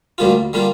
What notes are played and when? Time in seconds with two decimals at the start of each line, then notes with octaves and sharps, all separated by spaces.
0.18 D2 D3 G3 A#3 F4
0.53 D3 G3 A#3 F4